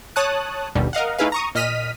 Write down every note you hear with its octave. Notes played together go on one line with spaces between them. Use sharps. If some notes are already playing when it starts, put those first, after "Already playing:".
C#5 A5 D#6 F#6
G1 D#2 B2 D3 G3
A#4 D#5 F5 F#5
A3 D#4 E4 G#4 B4 F5
A#5 C#6 D#6
A#2 D#5 F6 B6 D#7